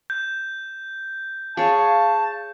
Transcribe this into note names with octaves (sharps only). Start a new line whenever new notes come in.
G6
G#4 C#5 F5 A5